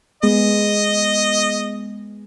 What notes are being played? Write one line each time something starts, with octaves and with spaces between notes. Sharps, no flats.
G#3 B3 G#4 D#5